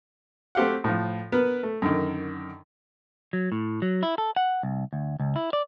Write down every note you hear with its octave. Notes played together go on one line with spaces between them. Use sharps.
A3 C4 G4 F5 F#5
A2 F3
B3 A#4 B4
A3
F#2 D3 D#3
F#3
A2
F#3
E4
A4
F#5
C2
D2
C#2
E4
D5